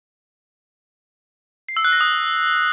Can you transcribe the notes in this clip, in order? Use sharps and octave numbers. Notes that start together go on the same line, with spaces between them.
C7
E6
F#6
A#6
D#6